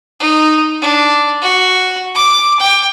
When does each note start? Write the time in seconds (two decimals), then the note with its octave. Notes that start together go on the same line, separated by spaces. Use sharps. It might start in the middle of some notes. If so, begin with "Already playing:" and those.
0.20 D#4
0.82 D4
1.42 F#4
2.15 D6
2.59 G5